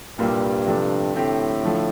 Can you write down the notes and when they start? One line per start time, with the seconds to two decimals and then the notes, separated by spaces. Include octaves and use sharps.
0.18 C2 G2 A#2 G3 A#3
0.66 C3 F3 A3 D4
1.15 A2 D3 A3 C4 G4
1.63 D3 F3 A3